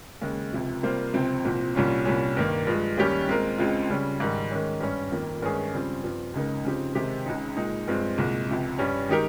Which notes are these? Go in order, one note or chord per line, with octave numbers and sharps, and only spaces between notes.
D#2 C#3 G#3
C#2 C3 F3
C3 G3 A#3 F4 C5
C#2 C3 F3 C4
C2 A#2 F3 C4
C2 A#2 G3 C#4 F4
C2 A#2 G3 C#4
G2 D#3 A#3
G2 F3 G#3
D#2 D#3 G3 C#4 G4
A#2 G#3 C4 F4 A#4
C#2 C#3 G#3 C4 F4
C#3 G3 C#4
G#2 D#3 G3
D#3 G#3 C#4
G2 G3 C#4
F2 D#3 A#3
G2 D#3 G#3 C#4 G#4
C#3 G3 C4 F4 G#4
G2 F3 C4
C#2 C#3 G#3 D#4 A#4
C#3 F3 C4 D#4 G4
C3 D#3 G#3 C4 G4
C#2 C#3 G#3 D#4
A#2 G#3 D#4
G2 F3 G#3 C4
C2 A#2 G#3
C#2 C3 F3
G2 G3 C#4
D#3 G#3 D#4 G4 A#4